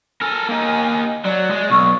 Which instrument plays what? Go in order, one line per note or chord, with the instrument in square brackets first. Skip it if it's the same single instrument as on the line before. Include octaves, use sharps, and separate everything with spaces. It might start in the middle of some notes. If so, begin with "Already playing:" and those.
[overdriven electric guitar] A4 A#4 [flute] G#5
[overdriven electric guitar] A#3 D#4
[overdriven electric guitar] F#3 [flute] D5
[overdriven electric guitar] G#3
[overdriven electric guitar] B1 [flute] C#6